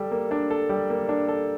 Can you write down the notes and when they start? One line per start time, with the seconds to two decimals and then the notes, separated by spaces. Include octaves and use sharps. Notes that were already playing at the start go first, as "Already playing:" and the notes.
Already playing: G3 A4
0.11 A#3
0.31 D4
0.50 A4
0.69 G3
0.90 A#3
1.09 D4
1.28 A4